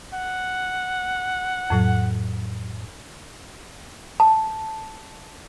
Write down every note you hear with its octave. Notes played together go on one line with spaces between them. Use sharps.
F#5
F2 A2 F#3
A5